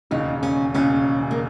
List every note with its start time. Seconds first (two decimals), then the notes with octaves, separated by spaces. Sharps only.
0.11 E1 D#2 C#3 D#4
0.43 C#4
0.74 E1 D#2 C#3 C#4
1.31 A#3